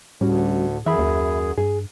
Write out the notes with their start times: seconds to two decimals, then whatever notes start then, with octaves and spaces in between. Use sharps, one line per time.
0.21 D2 A2 G3 C#4 F#4
0.86 F#2 E3 G#4 E5 B5
0.99 D#2
1.58 G2 G#4